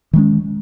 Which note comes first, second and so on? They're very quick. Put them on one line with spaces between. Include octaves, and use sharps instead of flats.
D#3 G#3 C#4